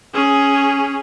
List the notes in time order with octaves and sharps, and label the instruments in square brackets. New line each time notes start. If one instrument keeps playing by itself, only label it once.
[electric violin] C#4 G#4